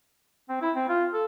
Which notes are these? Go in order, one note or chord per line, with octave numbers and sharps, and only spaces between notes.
C4
E4
C4
F4
A4